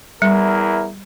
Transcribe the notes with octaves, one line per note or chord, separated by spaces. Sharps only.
E2 G3 E4 A#4